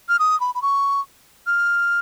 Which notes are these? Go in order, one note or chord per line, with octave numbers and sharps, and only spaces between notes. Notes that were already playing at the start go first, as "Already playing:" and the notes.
F6
D#6
B5
B5
C#6
F6